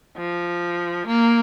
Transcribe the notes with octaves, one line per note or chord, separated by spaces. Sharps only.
F3
A#3